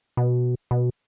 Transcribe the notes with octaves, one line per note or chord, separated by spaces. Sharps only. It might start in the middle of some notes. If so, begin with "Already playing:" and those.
B2
B2